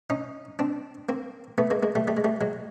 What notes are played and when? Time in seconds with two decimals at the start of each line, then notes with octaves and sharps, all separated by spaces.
0.10 C#4 D#4
0.59 C4 D4
1.09 A#3 C4
1.58 A3 B3
1.70 G#3 A#3
1.83 G#3 A#3
1.95 G3 A3
2.08 G3 A3
2.17 G#3
2.24 G3 A3
2.41 F#3 G#3